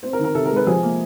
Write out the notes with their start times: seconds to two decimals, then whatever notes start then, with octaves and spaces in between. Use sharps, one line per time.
0.03 C4 C5
0.13 A#4
0.19 D#3
0.24 A#4
0.35 C3 A4
0.46 A#4
0.51 G#3
0.56 B4
0.67 F3 G#4
0.83 A#3